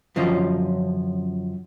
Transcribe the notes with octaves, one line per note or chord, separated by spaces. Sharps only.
F#2 D3 F3 C#4 F4 D#5